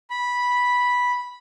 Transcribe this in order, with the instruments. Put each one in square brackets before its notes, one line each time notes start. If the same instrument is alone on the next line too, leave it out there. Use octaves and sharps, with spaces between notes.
[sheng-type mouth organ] B5